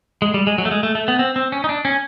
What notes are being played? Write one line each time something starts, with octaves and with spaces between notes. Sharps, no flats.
G#3
G3
G#3
F#3
A3
G#3
A3
A3
B3
C4
C4
C#4
D#4
D4
C#4